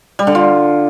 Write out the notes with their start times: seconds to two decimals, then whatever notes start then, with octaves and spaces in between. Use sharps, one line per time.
0.19 G3
0.27 D3
0.35 F4